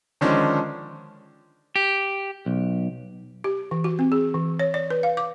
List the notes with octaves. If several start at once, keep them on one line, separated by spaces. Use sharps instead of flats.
D3 D#3 F3 G#3 C#4 D4
G4
B1
G4
E3
F#4
C4
G#4
E3
C#5
D5
B4
F5
D6